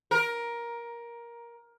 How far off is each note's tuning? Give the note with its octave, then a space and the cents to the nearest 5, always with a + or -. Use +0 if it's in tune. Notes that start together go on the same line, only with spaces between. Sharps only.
A#4 +15